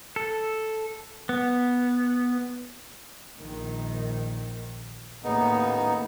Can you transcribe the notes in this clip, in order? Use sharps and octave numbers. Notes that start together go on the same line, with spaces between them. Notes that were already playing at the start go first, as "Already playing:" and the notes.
A4
B3
A#1 D#3
D#2 A2 C#3 A#3 B3 D#4